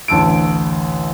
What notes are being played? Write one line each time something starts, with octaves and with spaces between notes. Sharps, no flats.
A1 D2 A5 E6 D7